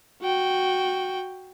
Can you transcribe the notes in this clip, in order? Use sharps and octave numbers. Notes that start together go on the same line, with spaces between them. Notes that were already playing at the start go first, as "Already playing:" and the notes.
F#4 G5